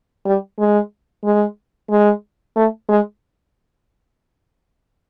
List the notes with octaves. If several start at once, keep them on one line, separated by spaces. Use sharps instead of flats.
G3
G#3
G#3
G#3
A3
G#3